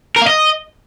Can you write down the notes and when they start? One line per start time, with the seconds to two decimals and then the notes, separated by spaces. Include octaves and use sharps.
0.16 A#4
0.22 F5
0.27 D#5